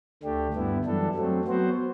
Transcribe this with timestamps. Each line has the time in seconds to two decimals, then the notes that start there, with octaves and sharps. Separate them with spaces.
0.23 D2 D3 A3 D4 G4
0.53 G2 D3 G3 B3 E4
0.85 F#2 E3 G3 D4 A4
1.15 F#3 A3 C4
1.45 F#3 B3 F#4 C5